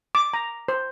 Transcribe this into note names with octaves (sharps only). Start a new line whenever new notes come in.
D6
A#5
C5